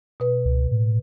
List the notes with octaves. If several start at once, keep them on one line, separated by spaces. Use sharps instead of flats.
B2 B4
C#2
A2